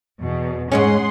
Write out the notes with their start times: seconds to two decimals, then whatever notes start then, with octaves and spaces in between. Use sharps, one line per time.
0.21 E2 B2
0.72 G#2 G#3 C#4 G#4 F#5 C6